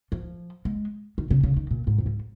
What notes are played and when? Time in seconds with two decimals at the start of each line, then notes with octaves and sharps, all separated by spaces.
0.12 F3
0.65 G#3
1.18 D#3
1.31 C#3
1.43 C#3
1.56 D#3
1.71 A#2
1.87 G#2
1.98 F2
2.06 G#2